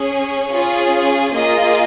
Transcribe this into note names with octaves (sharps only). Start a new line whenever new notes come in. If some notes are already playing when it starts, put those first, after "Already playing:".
Already playing: C#4 G#4
C#5
C#4 F4 G#4
A#3 F4 G#4 D#5